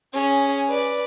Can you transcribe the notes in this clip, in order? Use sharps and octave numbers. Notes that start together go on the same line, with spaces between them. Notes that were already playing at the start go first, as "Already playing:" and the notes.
C#4 G#4
B4 D5